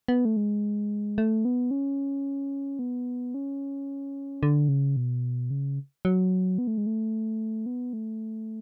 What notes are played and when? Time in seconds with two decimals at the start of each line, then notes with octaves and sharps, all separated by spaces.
0.08 B3
0.25 A3
0.37 G#3
1.18 A3
1.45 B3
1.71 C#4
2.79 B3
3.34 C#4
4.43 D3
4.69 C#3
4.97 B2
5.50 C#3
6.05 F#3
6.58 B3
6.67 A3
6.78 G#3
6.87 A3
7.66 B3
7.93 A3